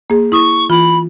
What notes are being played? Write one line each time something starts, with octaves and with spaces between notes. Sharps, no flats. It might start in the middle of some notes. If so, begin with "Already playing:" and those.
A#3 G#4
E4 C#6 D#6
E3 F4 B5